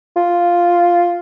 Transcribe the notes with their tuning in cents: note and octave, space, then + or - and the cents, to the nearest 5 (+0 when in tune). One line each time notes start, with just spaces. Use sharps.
F4 +0